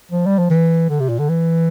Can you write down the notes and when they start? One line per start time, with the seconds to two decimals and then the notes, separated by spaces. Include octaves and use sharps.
0.11 F3
0.26 G3
0.39 F3
0.50 E3
0.90 D3
1.00 C3
1.09 A#2
1.19 D3
1.29 E3